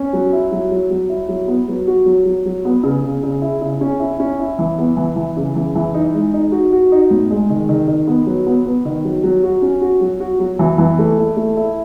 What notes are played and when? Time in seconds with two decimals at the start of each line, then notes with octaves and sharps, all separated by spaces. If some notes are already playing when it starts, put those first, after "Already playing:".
Already playing: C#4
0.13 F#3
0.33 E4
0.52 F#3
0.71 F#3
0.91 F#3
1.09 E4
1.29 F#3
1.48 B3
1.68 F#3
1.87 F#4
2.06 F#3
2.25 F#3
2.46 F#3
2.65 B3
2.83 C#3
3.04 C#3
3.23 C#3
3.42 E4
3.61 C#3
3.81 C#4
4.00 E4
4.20 C#4
4.39 E4
4.59 E3
4.78 B3
4.97 E3
5.16 E3
5.37 C#3
5.55 E3
5.75 E3
5.94 D#4
6.14 G#3
6.33 D#4
6.52 F#4
6.72 F#4
6.92 D#4
7.11 A2
7.30 G#3
7.50 D#3
7.69 D#3
7.88 D#3
8.07 B3
8.27 F#3
8.46 B3
8.65 B3
8.85 D#3
9.05 F#3
9.24 F#3
9.44 F#4
9.62 C#4
9.81 F#4
10.01 F#3
10.20 F#4
10.39 F#3
10.59 E3
10.78 E3
10.99 A3
11.18 E4
11.37 A3
11.57 E4